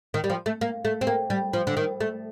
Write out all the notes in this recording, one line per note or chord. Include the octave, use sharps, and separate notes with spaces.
D#3
G3
F3
A3
A#3
A3
C4
A#3
G3
F3
D3
D#3
A3